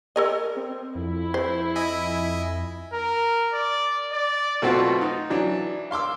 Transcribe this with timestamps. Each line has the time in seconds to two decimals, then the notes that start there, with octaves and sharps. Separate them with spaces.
0.16 A4 A#4 D#5
0.56 C4
0.95 F2 E4
1.34 C5
1.76 D#5 E5 G#5
2.93 A#4
3.54 D5
4.13 D5
4.62 B2 A3 B3 C4 F4 F#4
5.01 D#4
5.30 E3 F#3 D4
5.91 F5 C6 D6 E6